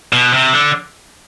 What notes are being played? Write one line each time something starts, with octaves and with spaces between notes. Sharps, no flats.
B2
C3
D3